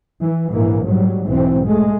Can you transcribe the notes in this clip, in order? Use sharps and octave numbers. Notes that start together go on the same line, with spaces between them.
E3
A#1 G#2 E3 A#3
G#2 F#3 G3
B1 G#2 E3 C4
G#3 A3